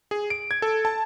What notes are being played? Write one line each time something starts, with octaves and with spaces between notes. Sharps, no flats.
G#4
D7
G#6
A4
A5